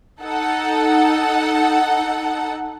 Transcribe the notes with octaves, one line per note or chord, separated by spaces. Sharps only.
D#4 A4 F#5